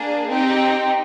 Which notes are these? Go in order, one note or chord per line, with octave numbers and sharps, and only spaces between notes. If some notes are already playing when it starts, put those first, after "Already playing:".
Already playing: A#3 D4 G#4
C4 D#4 G4